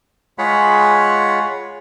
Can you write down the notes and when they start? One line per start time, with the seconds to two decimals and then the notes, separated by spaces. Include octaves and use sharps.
0.38 G#3 F4 G#4 C#5 F#5 B5